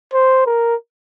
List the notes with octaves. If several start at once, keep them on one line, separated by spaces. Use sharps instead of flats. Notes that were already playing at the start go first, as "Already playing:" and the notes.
C5
A#4